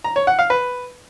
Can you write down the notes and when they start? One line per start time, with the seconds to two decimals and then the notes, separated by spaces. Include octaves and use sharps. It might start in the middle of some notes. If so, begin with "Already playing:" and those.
0.04 A#5
0.16 C#5
0.27 F#5
0.39 F5
0.50 B4